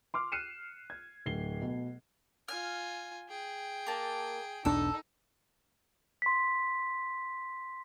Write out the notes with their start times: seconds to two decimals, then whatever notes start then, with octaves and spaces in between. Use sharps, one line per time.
0.14 C6 D6 F6
0.32 F6 F#6 C7 C#7 D#7 E7
0.90 G#6
1.26 D1 C7 G7
1.62 B2
2.48 F4 G#5 F6
3.29 G#4 G5
3.87 A#3 A5
4.65 E1 B1 D4 D#4 A4
6.22 C6 B6